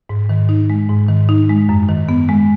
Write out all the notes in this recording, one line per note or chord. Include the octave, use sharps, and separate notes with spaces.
G#2
D#3
D#4
G#3
G#2
D#3
D#4
G#3
F#2
D#3
B3
G#3